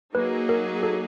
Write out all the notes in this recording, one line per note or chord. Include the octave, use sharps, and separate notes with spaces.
F#3 A#3 D#4 G#4 B4
A#4
A4